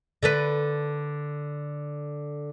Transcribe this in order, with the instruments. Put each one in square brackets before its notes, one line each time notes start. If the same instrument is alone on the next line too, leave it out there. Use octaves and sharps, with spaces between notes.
[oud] D3 A4 B4